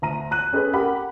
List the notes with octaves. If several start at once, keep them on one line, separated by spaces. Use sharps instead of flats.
D2 A#5 D#7
A#5 F#6 D#7
C#4 G#4 A4 B4
G4 A#4 F#5 B5